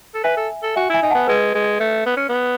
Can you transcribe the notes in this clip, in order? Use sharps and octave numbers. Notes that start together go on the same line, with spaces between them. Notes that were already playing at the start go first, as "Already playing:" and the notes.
A4
B4 E5 G#5
A4
A4
F#4 E5 G#5
E4 E5 G#5
D#4 G#5
F#5 A5
B3
G#3 B4
G#3
A3
B3
C#4
B3